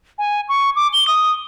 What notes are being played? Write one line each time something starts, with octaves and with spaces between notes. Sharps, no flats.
G#5
C#6
D6
G7
D#6